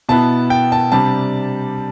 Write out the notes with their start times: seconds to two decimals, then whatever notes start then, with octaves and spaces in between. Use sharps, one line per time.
0.09 B2 B3 E4 A5
0.50 G5
0.72 A5
0.92 C3 G3 D4 A5